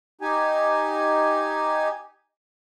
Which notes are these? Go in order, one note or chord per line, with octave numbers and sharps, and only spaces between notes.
D#4 G4 G#5